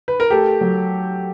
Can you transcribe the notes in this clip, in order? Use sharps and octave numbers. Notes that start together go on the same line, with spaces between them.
B4
A#4
A3 G4 A4
F#3